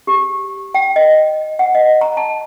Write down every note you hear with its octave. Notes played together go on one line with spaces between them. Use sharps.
G4
G5
D#5
F#5
D#5
A#5
A5